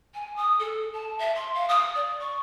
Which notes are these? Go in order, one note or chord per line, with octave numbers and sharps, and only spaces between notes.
G#5
D#6
A4
A5
E5
C6
F5
D#6
D5
C#6